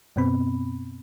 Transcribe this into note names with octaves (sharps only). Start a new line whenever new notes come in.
F#2 B2 B3 C4 B5